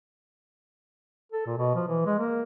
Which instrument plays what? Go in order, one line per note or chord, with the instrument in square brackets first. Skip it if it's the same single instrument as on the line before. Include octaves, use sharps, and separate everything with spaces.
[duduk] A4
A#2
B2
F3
E3
G#3
A#3